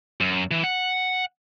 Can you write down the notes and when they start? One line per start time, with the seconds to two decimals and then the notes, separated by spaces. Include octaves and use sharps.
0.21 F#2
0.51 E3
0.64 F#5